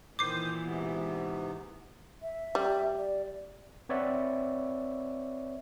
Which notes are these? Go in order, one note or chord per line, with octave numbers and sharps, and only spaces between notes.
A#2 D#3 E3 C5 D6 D#6 C7
G#2 C3 B3
E5
G3
D5
C4 B4 C#5 D5 E5 F#5